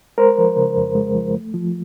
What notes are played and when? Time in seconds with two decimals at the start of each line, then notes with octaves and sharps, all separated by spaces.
0.18 G#3 A#4 C5
0.38 F3
0.57 C#3
0.76 F2
0.95 G#3
1.15 F3
1.34 A3
1.54 F3